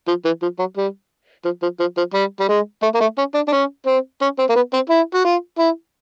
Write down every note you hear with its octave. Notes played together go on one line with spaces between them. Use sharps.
F3
E3
F3
F#3
G3
F3
F3
F3
F3
G3
G3
G#3
A3
A#3
A3
C#4
D4
D4
C#4
C4
C#4
C4
A#3
B3
C4
E4
F#4
F4
E4